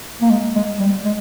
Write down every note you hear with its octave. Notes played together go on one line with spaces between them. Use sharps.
A#3
G#3
G#3
G3
G#3